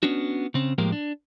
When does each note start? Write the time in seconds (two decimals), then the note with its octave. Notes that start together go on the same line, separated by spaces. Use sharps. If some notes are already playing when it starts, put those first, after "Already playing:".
0.03 B3 C#4 D4 F#4
0.54 C#3 C4
0.78 A2 F3 G#3 A#3 G4 A#4
0.92 D4